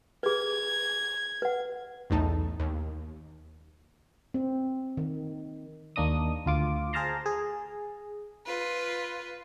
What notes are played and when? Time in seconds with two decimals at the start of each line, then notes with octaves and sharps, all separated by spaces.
0.23 G#4 B4 G#6
1.42 B4 F#5
2.10 B1 E2 A2 D#4 A5
2.60 D#2
4.34 C4
4.97 D#3
5.96 D#2 A#3 D4 D#5 D#6
6.46 D2 F4 D6
6.93 G#4 C5 F5 A5 A#5 C6
7.26 G#4
8.46 F4 B4